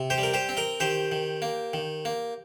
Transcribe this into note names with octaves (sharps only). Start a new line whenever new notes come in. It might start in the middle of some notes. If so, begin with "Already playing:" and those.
Already playing: C3
G4 C5
G3
A#4
G4 C5
C4
A#4 D#5
D#3 G4 C5
D#3
A#3
D#3
A#3